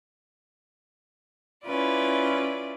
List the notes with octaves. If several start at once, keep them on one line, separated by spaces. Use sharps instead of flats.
C#4 E4 F4 B4 D5